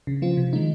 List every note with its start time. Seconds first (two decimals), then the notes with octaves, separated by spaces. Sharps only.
0.07 C#3
0.22 F3 C4 F4
0.37 C3
0.53 D#3 G#3 D#4